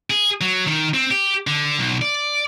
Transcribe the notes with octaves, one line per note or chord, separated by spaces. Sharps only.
G#4
F#3
D#3
C4
G4
D3
B1
D5